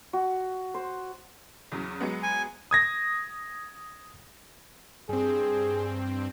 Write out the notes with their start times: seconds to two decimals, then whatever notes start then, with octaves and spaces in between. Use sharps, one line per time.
0.13 F#4
0.74 C5
1.72 E2 C#3 F#3
2.01 F#3 G#3 B3
2.23 G#5
2.71 D#6 G#6 A#6
5.09 G2 C4 G#4